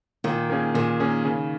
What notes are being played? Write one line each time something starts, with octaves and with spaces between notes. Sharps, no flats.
A#2 D#3
A#3 C#4 G#4
A#2 D#3
A#3 C#4 G#4
C#3